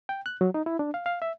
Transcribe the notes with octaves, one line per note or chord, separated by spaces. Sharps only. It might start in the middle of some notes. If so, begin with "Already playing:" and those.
G5
F#6
F#3
D#4
E4
D4
F5
F5
E5